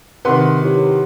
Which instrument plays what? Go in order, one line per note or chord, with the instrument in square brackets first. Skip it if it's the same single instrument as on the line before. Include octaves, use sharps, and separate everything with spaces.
[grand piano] C3 D#3 [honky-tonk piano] B4 F#5 C6
[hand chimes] E4 G4 C#5